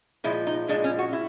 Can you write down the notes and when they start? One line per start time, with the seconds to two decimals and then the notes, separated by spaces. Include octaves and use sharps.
0.24 A#2 F3 G#3 E4
0.47 D#4
0.68 A#2 F3 G#3 D4
0.84 C#4
0.99 F#4
1.13 E4